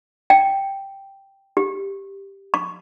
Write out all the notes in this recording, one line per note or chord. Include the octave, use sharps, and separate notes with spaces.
G5
G4
C#6